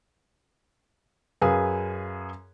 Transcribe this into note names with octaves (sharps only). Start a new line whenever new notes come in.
F#2 G#4 B4 F5 G#5